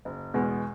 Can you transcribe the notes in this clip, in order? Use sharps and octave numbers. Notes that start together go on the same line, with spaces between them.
F#1
E2 B2 G#3